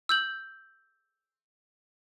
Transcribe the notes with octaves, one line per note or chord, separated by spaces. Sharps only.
E6 G6 F#7